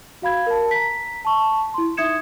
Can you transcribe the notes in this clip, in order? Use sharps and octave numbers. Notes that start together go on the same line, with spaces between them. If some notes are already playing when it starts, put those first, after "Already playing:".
F#4 F5 B5 G#6
A#4 A5
A#5 B6
A5 C#6
E4 C6
D#4 E5 D#6 G#6 C#7 E7